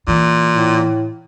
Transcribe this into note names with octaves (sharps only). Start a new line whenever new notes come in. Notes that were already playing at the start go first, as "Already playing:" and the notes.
A#2 E3
A2